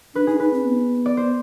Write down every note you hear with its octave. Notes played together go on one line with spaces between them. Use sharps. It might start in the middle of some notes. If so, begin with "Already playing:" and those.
D4 B4
D#4 G#4
D#4 B4
C4
B3
D5
C5